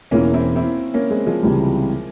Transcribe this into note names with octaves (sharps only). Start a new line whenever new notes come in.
E1 E2 E3 A#3 C#4
C4 E4
C4 E4
A#3 C#4
G#3 C4
F3 G#3
C#2 C3 E3 G3